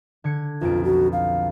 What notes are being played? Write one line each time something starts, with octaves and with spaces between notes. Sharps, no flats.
D3 G#6 C#7
B1 F2 F4 D7
F#4
F5